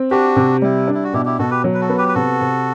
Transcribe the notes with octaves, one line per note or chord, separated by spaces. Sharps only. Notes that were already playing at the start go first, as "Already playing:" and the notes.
Already playing: C4
D4 F#4 G4
C3
G3 E4
D4
E4
F#4
B2 E4 G4
E4 G4
B2 F#4 A4
G4 B4
F#3
B4
F#4 A4
B3
G4 B4
B4
C3 F#4 A4
C3